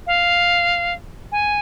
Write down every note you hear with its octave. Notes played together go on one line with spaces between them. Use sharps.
F5
G#5